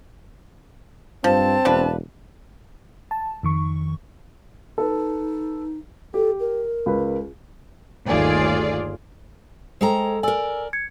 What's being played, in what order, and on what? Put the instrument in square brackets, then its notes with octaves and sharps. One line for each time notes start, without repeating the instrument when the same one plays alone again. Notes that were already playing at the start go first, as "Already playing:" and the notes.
[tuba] G2 [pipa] F3 [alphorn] C4 [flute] A5
[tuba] E1 [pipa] F3 D4 B4
[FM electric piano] A5
F2 D#3 C#6
[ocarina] D#4 [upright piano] A4 B4
[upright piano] G4 [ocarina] A4
[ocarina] A#4
[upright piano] C#2 B4
[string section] G1 D#2 A3 F4 G#4 D5
[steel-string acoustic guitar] G#3 A4 A#5 [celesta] C5 G5
[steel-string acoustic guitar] A#4 D5 [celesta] G#5 E6
[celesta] G#6 C#7